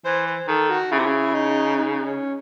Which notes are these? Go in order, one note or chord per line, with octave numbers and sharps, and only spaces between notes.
E3 C5
C5
D#3 A4
F#4
C#3 E4
C3
C#3
D#4
D#4
C#4